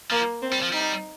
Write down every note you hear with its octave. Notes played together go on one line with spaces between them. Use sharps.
F3 A#3
C4
G3
F3
G3 D#4